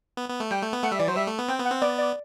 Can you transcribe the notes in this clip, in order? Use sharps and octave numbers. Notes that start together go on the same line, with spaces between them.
B3
B3
A3
G3 G5
A3
B3
A3 F#5
G3 E5
E3 D5
F#3 C5
G3 E5
A3
B3
C4 G5
B3
F#5
C4
B3 D5
D5